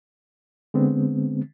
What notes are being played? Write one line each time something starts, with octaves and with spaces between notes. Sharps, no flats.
D3 G#3 B3 C4